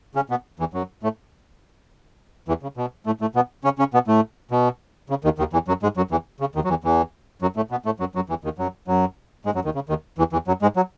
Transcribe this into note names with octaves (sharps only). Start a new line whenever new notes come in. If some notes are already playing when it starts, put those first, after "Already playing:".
C#3 C#4
B2 B3
E2 E3
F#2 F#3
A2 A3
E2 E3
C#3
B2
A2 A3
A2 A3
B2 B3
C#3 C#4
C#3 C#4
B2 B3
A2 A3
B2
C#3
D#2 D#3
D#2 D#3
E2 E3
F#2 F#3
G#2 G#3
F#2 F#3
E2 E3
C#3
D#2 D#3
F#3
E2 E3
E2 E3
F#2 F#3
A2 A3
B2 B3
A2 A3
F#2 F#3
F#2 F#3
E2 E3
D#2 D#3
F#2 F#3
F#2 F#3
G#2 G#3
F#2 F#3
D#2 D#3
C#3
D#2 D#3
E2 E3
E2 E3
F#2 F#3
G#2 G#3
F#3